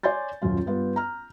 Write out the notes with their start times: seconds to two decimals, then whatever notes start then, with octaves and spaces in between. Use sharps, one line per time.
0.03 C#5 D5 G#5 C6 G6 A6
0.42 D#1 F#2 F4
0.67 G2 B3 F4
0.96 A#5 F6